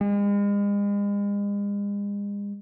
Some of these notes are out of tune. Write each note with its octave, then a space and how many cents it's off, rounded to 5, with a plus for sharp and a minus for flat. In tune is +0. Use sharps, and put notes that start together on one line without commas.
G#3 -40